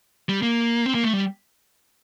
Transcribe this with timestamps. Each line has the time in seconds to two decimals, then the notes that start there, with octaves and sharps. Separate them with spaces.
0.29 G3
0.42 A#3
0.86 C4
0.95 A#3
1.04 A3
1.13 G3